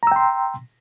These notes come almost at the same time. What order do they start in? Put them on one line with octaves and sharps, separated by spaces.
A#5 E6 G5 C6